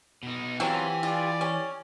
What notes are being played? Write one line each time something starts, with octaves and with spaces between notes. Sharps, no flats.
B2 D#4
E3 F#3 C4 F4 G4 G#5
F4 D5
C#4